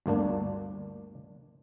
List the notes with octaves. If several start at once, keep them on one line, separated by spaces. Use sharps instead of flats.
G1 D2 A#3 D4